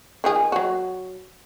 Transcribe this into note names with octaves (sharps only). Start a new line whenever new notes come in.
D#3 F3 G#4
F#3 F#4